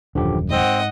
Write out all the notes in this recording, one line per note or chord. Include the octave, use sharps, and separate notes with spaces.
D#1 F#2 D3 F3 G4
G#2 C4 D#5 F#5